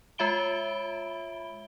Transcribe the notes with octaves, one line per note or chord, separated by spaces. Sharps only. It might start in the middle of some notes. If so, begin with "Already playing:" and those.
G#3 F4 E5 B5 D7 G7